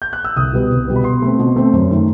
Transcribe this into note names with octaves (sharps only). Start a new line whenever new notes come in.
G6
F#6
E6
C2 D#6
B2 G3 B3
C2
B2 G3 B3
B5
B2 C6
A3 C4
B2
A3 C4
F#2
D#3 A3